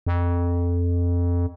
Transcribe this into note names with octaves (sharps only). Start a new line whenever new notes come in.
F2